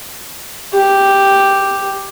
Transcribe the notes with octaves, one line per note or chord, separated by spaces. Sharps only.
G4